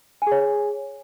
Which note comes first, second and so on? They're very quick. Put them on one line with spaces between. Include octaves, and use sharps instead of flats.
G#5 G#4 C#5